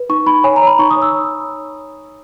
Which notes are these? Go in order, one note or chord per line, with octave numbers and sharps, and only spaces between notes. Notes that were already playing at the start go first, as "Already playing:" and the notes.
Already playing: B4
D#4 C#6
D#4 B5
C#5 G#5
A#5
C#5 B5
D#4 C#6
D#6
C#5
E6